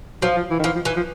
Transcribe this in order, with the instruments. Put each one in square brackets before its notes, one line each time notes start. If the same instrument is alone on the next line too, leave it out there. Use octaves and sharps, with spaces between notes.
[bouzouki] F3 [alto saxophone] F#3
[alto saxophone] F3
E3
D#3
[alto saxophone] E3 [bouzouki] F3
[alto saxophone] F3
[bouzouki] E3
[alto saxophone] F3